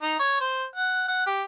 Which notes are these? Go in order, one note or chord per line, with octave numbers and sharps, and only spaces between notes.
D#4
C#5
C5
F#5
F#5
G4